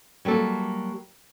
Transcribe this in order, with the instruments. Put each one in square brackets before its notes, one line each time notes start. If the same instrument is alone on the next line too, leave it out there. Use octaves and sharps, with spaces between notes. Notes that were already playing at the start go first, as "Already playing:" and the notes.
[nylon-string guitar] F#3 G3 A#3 A4